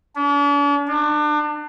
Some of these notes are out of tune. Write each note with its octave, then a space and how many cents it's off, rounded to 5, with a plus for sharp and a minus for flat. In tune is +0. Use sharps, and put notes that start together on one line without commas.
D4 -45
D4 +30